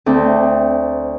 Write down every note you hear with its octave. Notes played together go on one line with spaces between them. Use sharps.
D2 C4